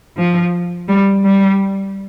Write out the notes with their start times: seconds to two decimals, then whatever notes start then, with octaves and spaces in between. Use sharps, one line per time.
0.17 F3
0.88 G3
1.24 G3